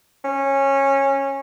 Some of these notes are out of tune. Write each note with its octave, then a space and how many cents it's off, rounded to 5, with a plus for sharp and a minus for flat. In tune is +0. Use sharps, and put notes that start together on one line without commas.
C#4 -15